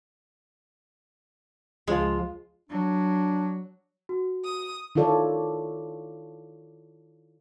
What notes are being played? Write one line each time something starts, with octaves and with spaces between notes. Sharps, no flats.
C#2 F3 G#3 F4
F#3 D4
F#4
D#6
D#3 E4 F4 A4 C#5 D5